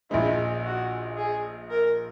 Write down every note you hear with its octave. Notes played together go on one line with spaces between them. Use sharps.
A#1 A#2 G#3 D#4 E4
F#4
G#4
A#4